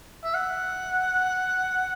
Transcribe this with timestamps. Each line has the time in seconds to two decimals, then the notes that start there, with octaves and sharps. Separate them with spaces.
0.24 E5
0.34 F#5